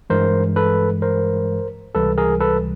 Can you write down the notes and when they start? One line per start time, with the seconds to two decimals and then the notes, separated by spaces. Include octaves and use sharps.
0.10 G2 E3 G#3 A#4 C5
0.56 A4 B4
1.02 A#4 C5
1.95 C#2 C3 E3 G3 A4 B4
2.18 G#4 A#4
2.40 A4 B4